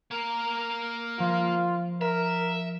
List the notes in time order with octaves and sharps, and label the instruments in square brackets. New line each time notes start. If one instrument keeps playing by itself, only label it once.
[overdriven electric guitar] A#3 A#4
[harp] F3 [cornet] F4
[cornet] A#4 [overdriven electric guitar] E5